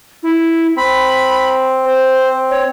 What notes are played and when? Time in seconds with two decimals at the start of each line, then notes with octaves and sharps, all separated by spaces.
0.23 E4
0.76 C4 B5
1.85 C5
2.50 C#5